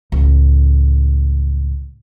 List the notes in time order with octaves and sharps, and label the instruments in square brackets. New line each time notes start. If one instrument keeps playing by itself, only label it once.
[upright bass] C#2 A2